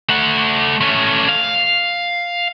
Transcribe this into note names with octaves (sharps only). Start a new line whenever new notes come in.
A3 F#5
A3 C#4
F5